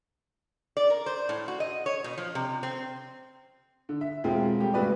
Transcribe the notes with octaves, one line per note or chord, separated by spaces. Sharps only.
D5
A#4
C5
A2
F#4
D#5
C#5
B2
F3
C3
C4
D3
E5
E1 G#3 C4 F4
G3 A3 G4
A1 C#3 G#3 F#4 B4 D5